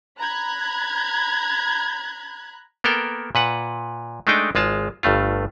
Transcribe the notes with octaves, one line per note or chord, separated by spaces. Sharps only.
A#5 B5 F#6 G#6
A#3 B3 A4 A#4 G5
A#2 B4 F#5
G#3 A3 D4 D#4 G5
G#1 G#3 F4 A5
G1 G2 A3 F4